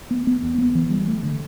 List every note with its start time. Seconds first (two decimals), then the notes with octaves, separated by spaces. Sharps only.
0.11 B3
0.27 B3
0.42 E2
0.58 B3
0.75 E3
0.90 G3
1.07 A3
1.23 D3